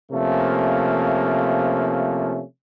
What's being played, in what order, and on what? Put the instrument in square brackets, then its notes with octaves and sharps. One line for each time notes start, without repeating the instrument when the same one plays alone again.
[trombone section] C3 F3 A3 A#3 C#4